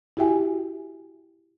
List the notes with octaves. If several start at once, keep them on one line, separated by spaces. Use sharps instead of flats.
E4 F#4 G4 E5 G5 G#5